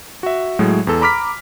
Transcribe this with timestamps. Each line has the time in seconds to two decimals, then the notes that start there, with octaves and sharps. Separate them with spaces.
0.23 F#4 E5
0.59 A2 F#3 G#3
0.87 E2 A4
1.01 A#5 B5 D6 F6 B6